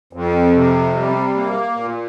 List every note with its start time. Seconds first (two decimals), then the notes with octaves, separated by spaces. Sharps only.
0.13 F2
0.55 C3
0.96 G3
1.36 A#3
1.77 A#2